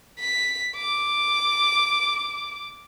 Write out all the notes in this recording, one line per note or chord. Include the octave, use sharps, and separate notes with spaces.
B6
D6